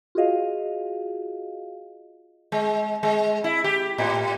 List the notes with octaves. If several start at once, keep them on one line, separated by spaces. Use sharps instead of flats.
F4 F#4 G#4 D#5 F5
G#3
G#3
E4
G4
A2